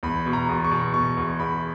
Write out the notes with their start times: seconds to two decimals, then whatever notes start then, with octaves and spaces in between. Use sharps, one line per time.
0.03 E2 B5
0.26 B2
0.33 A#5
0.49 E2
0.64 C#6
0.71 B2
0.94 B2 C#6
1.17 E2
1.39 E2 B5